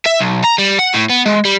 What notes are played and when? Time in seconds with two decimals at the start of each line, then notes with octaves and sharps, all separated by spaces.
0.06 E5
0.21 B1
0.44 A#5
0.59 G3
0.79 F#5
0.94 A2
1.10 B3
1.26 G#3
1.45 G3